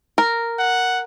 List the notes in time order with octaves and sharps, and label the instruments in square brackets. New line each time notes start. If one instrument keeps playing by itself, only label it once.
[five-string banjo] A#4
[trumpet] F#5